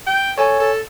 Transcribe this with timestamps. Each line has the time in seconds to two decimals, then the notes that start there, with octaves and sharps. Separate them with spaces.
0.07 G5
0.38 A4 C#5 G#5
0.60 A4